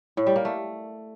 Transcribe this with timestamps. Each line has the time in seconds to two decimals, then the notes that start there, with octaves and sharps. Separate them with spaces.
0.17 A2
0.26 G3
0.36 A#3
0.45 A3